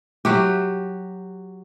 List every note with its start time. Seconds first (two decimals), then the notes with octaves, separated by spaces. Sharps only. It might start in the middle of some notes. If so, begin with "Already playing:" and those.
0.25 F#3 F#4 G4